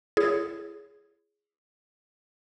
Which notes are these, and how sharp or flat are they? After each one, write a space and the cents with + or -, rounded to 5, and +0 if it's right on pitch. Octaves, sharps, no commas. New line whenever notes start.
E4 +40 G#4 +0 C#5 +20